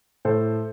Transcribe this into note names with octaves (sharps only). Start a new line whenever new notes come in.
A2 A4 C5